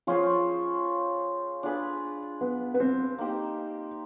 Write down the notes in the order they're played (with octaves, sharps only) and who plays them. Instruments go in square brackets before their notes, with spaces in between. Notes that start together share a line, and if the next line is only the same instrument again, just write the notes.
[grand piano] F3 [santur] C#4 F4 G#4 C5
[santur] D4 F4 G#4 B4
[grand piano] B3
B3
C4
[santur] A#3 D#4 G4 C5